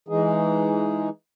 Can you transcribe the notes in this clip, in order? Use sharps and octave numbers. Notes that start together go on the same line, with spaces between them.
E3 G#3 D#4 G#4